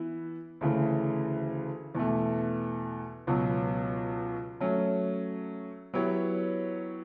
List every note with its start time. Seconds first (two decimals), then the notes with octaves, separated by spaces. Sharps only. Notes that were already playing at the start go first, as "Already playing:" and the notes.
Already playing: E3 B3 E4
0.61 D2 C#3 E3 A3
1.95 E2 B2 A3
3.27 C#2 B2 F#3
4.60 F#3 A3 C#4
5.93 F#3 B3 E4 G4 C#5